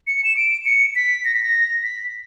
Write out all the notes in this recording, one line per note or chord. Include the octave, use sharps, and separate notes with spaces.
C#7
E7
D7
C#7
B6
A#6
B6
A#6
B6